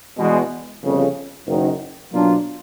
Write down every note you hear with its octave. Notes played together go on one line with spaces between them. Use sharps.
E2 B2 G#3
G1 F2 C#3
F#1 F#2 D#3
B2 F#3 A#3 D4 F4